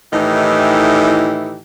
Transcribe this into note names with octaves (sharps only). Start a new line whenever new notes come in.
A2 D#3 E3 D#4 E4 G4